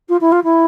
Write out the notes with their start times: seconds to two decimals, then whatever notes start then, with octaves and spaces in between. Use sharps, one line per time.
0.08 F4
0.20 E4
0.32 F4
0.43 E4